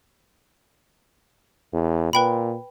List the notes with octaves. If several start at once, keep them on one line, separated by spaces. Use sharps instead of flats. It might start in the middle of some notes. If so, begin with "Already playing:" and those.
E2
A#2 B4 G5 B5